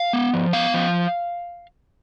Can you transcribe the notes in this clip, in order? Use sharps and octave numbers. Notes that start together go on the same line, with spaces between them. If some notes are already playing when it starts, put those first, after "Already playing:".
Already playing: F5
B3
F3
B3 F5
F3